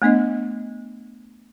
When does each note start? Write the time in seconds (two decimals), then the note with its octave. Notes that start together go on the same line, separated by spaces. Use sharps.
0.02 A3 B3 D4 D#5